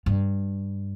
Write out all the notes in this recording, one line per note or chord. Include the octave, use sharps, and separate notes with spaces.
G2